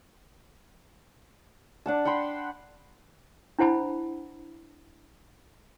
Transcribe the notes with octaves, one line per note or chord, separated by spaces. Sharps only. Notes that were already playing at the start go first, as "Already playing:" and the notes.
D4 F#5 A5
F#5 G5 B5 C6
D4 E4 C5 F#5 A5 B5